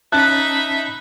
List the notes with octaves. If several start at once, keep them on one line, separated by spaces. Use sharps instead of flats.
C#4 D#4 E5 A5 B5 F#6